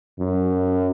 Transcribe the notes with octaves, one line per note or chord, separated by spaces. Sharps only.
F#2